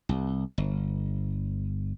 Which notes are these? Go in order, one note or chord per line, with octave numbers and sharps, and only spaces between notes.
C2
G1